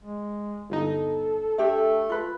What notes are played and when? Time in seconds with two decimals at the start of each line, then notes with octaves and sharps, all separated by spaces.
0.04 G#3
0.70 G1 D#4 A4
1.58 A3 D4 G4 E5
2.09 F4 B4